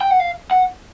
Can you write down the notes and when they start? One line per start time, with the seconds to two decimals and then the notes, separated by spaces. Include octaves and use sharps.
0.01 G5
0.11 F#5
0.20 F5
0.51 F#5